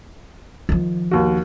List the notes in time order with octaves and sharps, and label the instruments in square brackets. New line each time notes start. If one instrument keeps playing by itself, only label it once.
[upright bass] D#3 F3
[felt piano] D#2 F#4